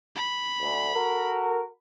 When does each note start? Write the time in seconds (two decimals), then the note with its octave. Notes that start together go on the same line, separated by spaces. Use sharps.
0.15 B5
0.62 D2
0.94 F#4 A4 A#4